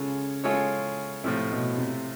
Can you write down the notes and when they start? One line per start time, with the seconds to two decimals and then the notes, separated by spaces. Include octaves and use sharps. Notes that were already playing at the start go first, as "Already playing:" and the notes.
Already playing: C#3 G#3 C#4 F4 A4 C#5
0.44 G#3 C#4 F4 A4 C#5
1.24 A2 C3 F3 A3
1.51 B2
1.77 C3